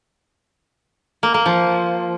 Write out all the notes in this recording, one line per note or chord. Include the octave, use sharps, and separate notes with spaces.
A#3
A#3
F3